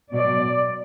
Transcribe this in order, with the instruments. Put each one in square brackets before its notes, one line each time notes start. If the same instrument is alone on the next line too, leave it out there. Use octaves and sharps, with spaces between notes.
[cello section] B2 F#3 D5